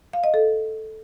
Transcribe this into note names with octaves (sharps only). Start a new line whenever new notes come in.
F5
D#5
A4